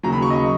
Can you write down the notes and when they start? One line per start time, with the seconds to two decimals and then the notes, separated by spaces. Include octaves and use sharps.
0.03 D#2 C#3 F#3 A#5
0.12 B5
0.22 C#6
0.30 D#5